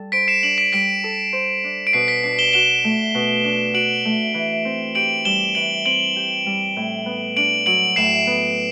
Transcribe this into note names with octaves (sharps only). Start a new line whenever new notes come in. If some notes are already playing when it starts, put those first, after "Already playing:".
Already playing: G3 A4
C5 B6 D7
C7 E7
D4 D7 F#7
B6 D7
G3 B6 D7
A4
C5
D4
D7
B2 C7
B6
D4 C7
E7 G7
F#4 E7 G7
A3
B2
D4
F#4 D7 F#7
A3
E3
C4
G4 D7 F#7
G3 E7 G7
E3 D7 F#7
C4 D7 F#7
G4
G3
A2
B3
D4 D7 F#7
F#3 D7 F#7
A2 C7 E7
B3